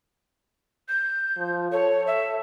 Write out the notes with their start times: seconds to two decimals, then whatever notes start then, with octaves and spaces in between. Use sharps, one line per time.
0.89 G6
1.37 F3
1.72 A4 C#5
2.07 E5